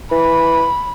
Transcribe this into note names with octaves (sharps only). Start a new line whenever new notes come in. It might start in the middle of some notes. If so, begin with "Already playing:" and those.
E3 B5